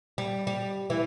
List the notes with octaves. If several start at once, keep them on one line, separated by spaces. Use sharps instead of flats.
G3
G3
E3